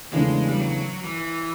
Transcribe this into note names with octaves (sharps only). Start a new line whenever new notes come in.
E2 C#3 E3 G#3 A3 D4
G3
F#3
E3